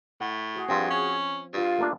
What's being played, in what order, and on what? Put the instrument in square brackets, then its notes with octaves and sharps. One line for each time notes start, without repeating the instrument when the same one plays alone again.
[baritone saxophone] A2 [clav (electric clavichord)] F#5
[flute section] F#4 G#4
[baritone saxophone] G2 [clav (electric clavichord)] F3 C4
[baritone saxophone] C#4
[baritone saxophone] G2 [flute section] F4
[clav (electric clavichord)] A3 A#3 D4